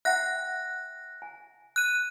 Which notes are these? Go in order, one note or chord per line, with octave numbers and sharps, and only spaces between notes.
E5 F#5 G5 F#6 A#6
G#5
F#6 D#7